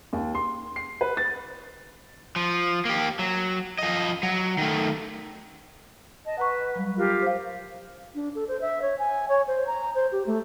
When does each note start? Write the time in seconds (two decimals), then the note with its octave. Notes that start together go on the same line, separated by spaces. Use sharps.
0.13 D#2
0.35 C6
0.76 C7
1.01 B4
1.17 A6
2.36 F3
2.85 A#3 G4
3.19 F#3
3.79 F3 D#5
4.23 F#3
4.58 D#3 A3
6.25 D#5 A5
6.38 B4 F#5 A#5 C#6
6.75 F#3 G3
6.96 F4 G4 A#4
7.22 C5 F5
8.15 D4
8.35 A4
8.48 C5
8.61 E5
8.82 C#5
8.99 G#5
9.29 C#5
9.48 C5
9.67 A#5
9.95 C5
10.12 G4
10.26 A3